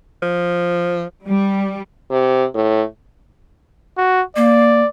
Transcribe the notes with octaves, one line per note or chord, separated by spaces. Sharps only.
F3
G3
C3
A2
F#4
A#3 D5